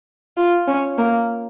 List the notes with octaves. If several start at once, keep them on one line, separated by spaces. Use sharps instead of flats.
F4
C#4
A#3